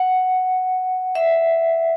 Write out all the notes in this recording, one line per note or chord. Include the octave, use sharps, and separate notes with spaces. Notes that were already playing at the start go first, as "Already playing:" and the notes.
Already playing: F#5
E5